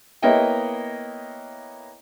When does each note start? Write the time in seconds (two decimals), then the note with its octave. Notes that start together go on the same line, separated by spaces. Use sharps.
0.22 A#3 B3 E4 C#5 D#5 G5